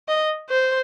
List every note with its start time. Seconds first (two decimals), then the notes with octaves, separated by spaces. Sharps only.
0.08 D#5
0.50 C5